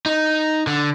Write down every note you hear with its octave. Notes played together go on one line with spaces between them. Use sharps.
D#4
D3